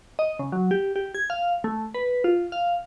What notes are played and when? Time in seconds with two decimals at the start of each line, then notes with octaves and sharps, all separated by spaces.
0.19 D#5
0.39 C#3
0.52 F#3
0.71 G4
0.96 G4
1.15 G#6
1.30 F5
1.64 A3
1.94 B4
2.24 F4
2.52 F5